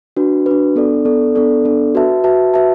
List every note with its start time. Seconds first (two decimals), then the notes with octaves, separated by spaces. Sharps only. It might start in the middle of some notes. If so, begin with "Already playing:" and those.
0.16 D4 F#4 B4
0.46 D4 F#4 B4
0.76 B3 D4 A4 D5
1.05 B3 D4 A4 D5
1.35 B3 D4 A4 D5
1.65 B3 D4 A4 D5
1.95 F#4 B4 E5 A5
2.24 F#4 B4 E5 A5
2.54 F#4 B4 E5 A5